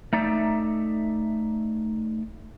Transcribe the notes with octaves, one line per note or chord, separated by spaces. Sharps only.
A3 D#4 D5 E5